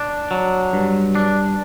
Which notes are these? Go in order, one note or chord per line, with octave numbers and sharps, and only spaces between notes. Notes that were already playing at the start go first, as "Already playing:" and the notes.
Already playing: D4
F#3
G2
D4